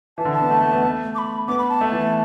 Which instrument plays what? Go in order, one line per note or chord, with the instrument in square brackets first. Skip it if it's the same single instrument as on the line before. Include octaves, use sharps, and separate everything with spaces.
[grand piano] E3 [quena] A5
[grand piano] D3
[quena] A5
[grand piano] B3
A3
A3
B3
A3
[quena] D6
B5
[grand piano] B3 [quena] D6
[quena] B5
A5
[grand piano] A3
E3